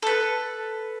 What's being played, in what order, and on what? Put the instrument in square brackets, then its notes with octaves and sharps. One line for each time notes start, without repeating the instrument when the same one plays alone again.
[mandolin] A4 B4